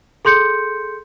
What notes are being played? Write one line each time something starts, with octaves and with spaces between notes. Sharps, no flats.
G#4 A4 C6 G6 C#7